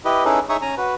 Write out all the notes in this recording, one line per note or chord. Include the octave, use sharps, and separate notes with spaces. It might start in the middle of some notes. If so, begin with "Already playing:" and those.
E4 G4 B4 D#5
C#4 D#4 E4 G#4 A4 B4
D#4 G#4 C#5 E5 C#6 D#6
C#4 G#5 A#5
F#4 B4